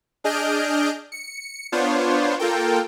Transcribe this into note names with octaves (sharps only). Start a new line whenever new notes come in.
D4 G#4 D#5 F6 G6 D7
C#7
B3 D4 F4 C5 C#5
A#3 F4 A4 A#4 G5